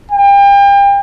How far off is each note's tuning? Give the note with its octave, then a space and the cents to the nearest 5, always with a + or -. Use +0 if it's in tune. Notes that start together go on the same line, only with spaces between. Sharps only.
G5 +35